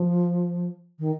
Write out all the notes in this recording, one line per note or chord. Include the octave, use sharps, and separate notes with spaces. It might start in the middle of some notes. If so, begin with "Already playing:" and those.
Already playing: F3
D#3